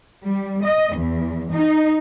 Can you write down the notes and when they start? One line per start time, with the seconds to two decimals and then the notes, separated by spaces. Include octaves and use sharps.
0.24 G3
0.63 D#5
0.96 E2
1.52 D#4